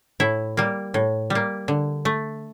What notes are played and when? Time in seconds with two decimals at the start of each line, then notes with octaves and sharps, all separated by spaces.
0.20 A2 E4
0.57 G3 A#3
0.94 A2
1.30 G3 A#3
1.68 D3
2.05 A3